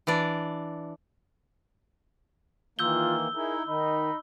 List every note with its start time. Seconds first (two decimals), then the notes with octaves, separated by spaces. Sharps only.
0.07 E3 D4 D5
2.79 D#3 E3 A#3 F4 E6 G6 G7
3.35 D#4 E4 G#4 A#4 E5
3.67 D#3 D#4 D#5 B5